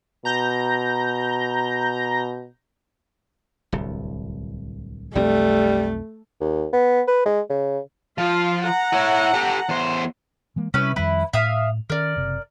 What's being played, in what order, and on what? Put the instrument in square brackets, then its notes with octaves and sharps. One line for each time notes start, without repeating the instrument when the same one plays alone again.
[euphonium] B2 [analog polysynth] A#5 G6 A#6
[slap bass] D1 C2
[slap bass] B1 F2 C4 [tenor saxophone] G3 [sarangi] A3
[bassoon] D#2
B3
B4
G#3
C#3
[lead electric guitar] F3 [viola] F4 F5
[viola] F#5 A#5
[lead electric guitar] E4 C#5
G4 A4
E2 C5
[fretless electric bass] E3 G#3 A#3
[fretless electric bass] C3 G3 C4 [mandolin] C#4 E4 B4
[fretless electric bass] F2 D#3 G3 [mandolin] E4 B4
[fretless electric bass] A2 [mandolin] E5 F5 D#6
[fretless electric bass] D#3 C#4 [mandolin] A#4 D5
[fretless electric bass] F#1 C3